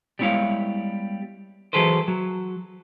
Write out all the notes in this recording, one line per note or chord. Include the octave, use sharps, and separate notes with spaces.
G3 G#3 B3 E4 C#5 F5
E3 F#3 G#4 A4 B4 C5
F#3